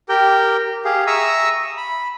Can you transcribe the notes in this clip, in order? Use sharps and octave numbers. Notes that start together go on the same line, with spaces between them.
G4 A#4 G5
G4 G#4 F5
E5 A#5 C#6 D#6 E6
B5